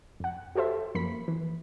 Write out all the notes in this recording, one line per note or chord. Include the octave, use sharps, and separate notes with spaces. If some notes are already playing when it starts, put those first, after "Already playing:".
F2 F#5
F#4 G4 A4 C5 E5
F#2 F3 A#3 B5 B6
E3